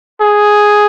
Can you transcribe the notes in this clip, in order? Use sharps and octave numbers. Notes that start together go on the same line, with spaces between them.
G#4